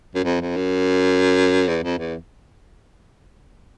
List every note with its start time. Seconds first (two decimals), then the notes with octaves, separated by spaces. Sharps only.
0.15 F#2
0.24 F2
0.41 F2
0.57 F#2
1.68 E2
1.84 F2
1.99 E2